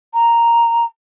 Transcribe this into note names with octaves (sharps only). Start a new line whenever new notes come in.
A#5